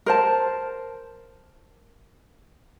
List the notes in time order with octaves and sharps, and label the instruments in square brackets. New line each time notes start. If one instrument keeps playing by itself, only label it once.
[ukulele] A#4 C5 A5